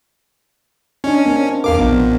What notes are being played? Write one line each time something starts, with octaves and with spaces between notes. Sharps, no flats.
C#4 D4 D#5
A#3 C4
E2 A#4 F5 D6
A#1 B3